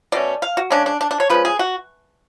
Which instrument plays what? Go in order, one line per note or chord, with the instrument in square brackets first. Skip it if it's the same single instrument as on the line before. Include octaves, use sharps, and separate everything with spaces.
[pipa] B2 A3 C#4 D5
F5
F#4
C#3 G#3 C#4 D4
D4
D4
D4
C#5
F3 G#3 C#4 B4
G#4
F#4